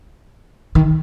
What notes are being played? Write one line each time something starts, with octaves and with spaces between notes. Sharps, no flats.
D#3